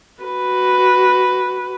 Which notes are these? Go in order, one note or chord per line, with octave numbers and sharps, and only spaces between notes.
F#4 B4